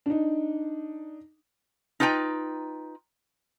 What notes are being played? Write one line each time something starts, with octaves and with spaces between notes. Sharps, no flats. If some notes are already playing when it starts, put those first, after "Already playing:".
D4 D#4
D#4 F4 B4 G5 A5 A#5